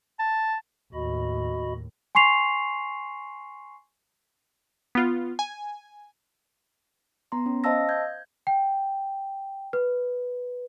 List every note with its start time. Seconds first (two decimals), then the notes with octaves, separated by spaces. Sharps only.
0.19 A5
0.94 D#2 A2 F#4 D#5 B5
2.15 G#5 C6 C#6 C7 F7
4.95 B3 F4
5.39 G#5
7.32 B3 A#5 C6
7.46 C#4
7.64 C5 D#5 F5 A5 E6 A#6
7.89 G6 G#6
8.47 G5
9.73 B4